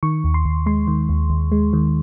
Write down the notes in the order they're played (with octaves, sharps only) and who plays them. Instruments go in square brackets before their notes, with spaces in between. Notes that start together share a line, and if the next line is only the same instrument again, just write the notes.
[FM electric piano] D#3 C#6
D#2
C6
D#2
G#3 C6
D#3
D#2
D#2
G#3
D#3